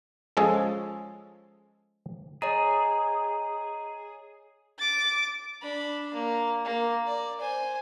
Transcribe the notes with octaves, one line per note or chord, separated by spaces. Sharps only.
F3 G#3 C#4 G#4 A4
G#4 C#5 D#5 A#5
D6 A6
D4 B5
A#3
A#3
D5
C5 G#5